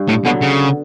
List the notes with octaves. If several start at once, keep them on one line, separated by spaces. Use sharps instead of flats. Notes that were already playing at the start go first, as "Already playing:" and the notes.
Already playing: G2
A2
B2 D3 F#3 B3
C#3